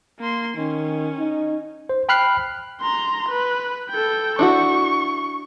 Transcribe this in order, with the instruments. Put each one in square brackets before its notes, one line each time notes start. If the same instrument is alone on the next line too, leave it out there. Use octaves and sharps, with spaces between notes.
[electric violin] A#3 C6
[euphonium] D#3 [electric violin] C#4
[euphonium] D#4
[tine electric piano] C5
G5 B5 F6 F#6 C7
[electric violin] A#5 C6
B4
A4 G5
[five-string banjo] D4 E4 F#4 [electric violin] C#6